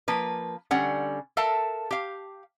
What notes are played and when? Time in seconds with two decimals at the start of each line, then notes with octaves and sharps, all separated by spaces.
0.08 F3 A#3 B4
0.71 D3 G3 C#4 F#5
1.37 A4 A#4 E5 F5 A5
1.91 G4 F5